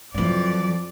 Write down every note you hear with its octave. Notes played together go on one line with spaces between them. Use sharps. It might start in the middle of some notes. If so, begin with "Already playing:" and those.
F2 E3 F#3 D5